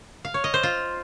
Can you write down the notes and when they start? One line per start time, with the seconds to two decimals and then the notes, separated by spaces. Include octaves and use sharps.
0.25 F5
0.34 C#5
0.44 D#5
0.54 C5
0.63 F4